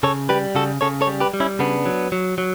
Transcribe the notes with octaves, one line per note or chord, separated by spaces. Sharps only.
C#3 A4 C#5
G3 G4 B4
C#3 F#4 A4
C#3 A4 C#5
A4 C#5
G3
G4 B4
G3
C#4 E4
C#3 B3 D4
F#3
F#3
F#3